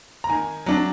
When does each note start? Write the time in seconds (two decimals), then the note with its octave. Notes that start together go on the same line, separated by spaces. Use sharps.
0.24 A#5
0.30 D#3 G#5
0.66 F#3 D4